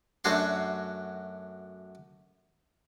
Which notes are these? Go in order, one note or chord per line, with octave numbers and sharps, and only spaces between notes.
F#2 A3 D4 F#4 C#5 C6